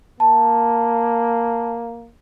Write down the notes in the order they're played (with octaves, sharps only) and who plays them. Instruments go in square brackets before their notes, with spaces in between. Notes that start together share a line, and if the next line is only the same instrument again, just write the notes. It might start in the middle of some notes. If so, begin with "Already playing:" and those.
[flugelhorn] A#3 [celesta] A5